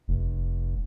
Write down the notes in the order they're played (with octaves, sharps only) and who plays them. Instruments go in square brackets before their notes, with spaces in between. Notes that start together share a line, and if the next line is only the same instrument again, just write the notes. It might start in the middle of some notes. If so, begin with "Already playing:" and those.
[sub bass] F1